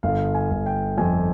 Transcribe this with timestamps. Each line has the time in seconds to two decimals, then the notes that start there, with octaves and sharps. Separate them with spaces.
0.03 G1 F5
0.34 G#5
0.51 G1
0.66 G5
0.98 F2 G#5